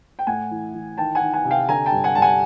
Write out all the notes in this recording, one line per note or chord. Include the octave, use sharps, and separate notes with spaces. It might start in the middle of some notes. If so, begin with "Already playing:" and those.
G5
A2 F#5 G#5
E3
E3
D#3 G5 A5
F#5 G#5
D#3
F#5 G#5
C3
F5 G5
D3 G#5 A#5
G5 A5
G2
F#5 G#5
G2 A5
F#5 G#5